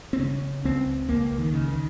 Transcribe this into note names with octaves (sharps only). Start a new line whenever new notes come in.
C4
C#3 C#4
C#2 C4
C#2 A#3
D#3
C#3
D#3